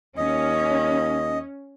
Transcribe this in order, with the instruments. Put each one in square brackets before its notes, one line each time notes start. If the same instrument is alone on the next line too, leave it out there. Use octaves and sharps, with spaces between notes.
[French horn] D#2 [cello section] C#4 [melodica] D#5